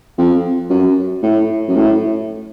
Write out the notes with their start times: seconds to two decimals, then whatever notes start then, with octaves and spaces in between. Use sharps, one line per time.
0.18 F2
0.70 F#2
1.22 A2
1.68 F#2
1.75 A2